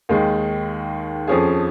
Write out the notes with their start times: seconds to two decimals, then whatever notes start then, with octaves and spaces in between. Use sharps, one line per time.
0.09 D#2 D#3 G#3
1.27 F2 F3 C#4 G#4